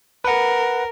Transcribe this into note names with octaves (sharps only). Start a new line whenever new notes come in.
A#4 B4 F#5